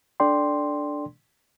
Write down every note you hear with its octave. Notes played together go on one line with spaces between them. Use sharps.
D4 A4 D5 G5 C6